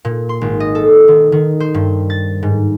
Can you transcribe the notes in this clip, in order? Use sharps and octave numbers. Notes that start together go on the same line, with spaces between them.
A#2
C6
G#1
D#5
A4
D#3
D#3
C5
G2
A6
G#2